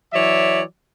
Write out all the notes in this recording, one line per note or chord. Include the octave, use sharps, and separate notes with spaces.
E3 F#3 C#5 D5 E5